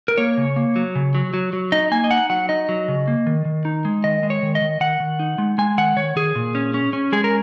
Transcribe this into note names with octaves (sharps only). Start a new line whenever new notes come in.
A#4
A#3 C#5
C#3
A#3
F#3
C#3
F#3
F#3
F#3
D#4 D#5
A#3 G#5
D#5
D#4 F#5
F#3 F#5
D#4 D#5
F#3
C#3
A#3
D#3
D#3
D#4
G#3
D#3 D#5
G#3
C#5
D#3
D#5
D#3
D#3 F#5
D#3
D#4
G#3
G#3 G#5
D#3 F#5
D#3 C#5
D#3 G#4
A#2
C#4
C#4
C#4
G#3 G#4
A#4